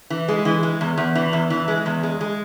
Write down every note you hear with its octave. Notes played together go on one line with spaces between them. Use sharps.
E3
G#3
E3
G#3
E2
E2
E3
E2
E3
G#3
E2
G#3
G#3